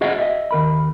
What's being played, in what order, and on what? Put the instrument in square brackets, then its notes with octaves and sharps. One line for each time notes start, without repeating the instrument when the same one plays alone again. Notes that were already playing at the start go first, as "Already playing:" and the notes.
[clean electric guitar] F#4 G#4 D#5 E5 F#5
D#5 E5
D#2 A#4 B5